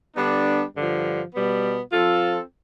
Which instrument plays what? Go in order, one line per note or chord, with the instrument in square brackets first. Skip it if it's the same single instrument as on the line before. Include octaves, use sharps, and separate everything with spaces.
[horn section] D3 G3 B3 D4
G2 D3 F3
B2 G3 B3
F3 C4 F4 A4